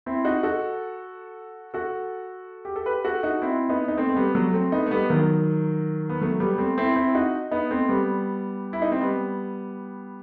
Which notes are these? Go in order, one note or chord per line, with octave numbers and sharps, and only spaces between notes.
C4 E4
D#4 F#4
F#4 A4
F#4 A4
G4
A4
G4 B4
F#4 A4
D#4 F#4
C4 E4
B3 D#4
D#4
A3 C4
C4
G3 B3
F#3 A3
A3 C4
B3 D#4
A3
G3 B3
D#3 F#3
B3
F#3 A3
G3 B3
A3 C4
C4 E4
C4 E4
D#4 F#4
B3 D#4
A3 C4
G3 B3
E4
D#4
C4
G3 B3